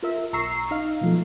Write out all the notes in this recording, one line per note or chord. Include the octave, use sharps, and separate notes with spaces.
F4 A#4 E5
B1 A#5 C#6 E6 C7
D#4 D#5 F5
B2 F3 A3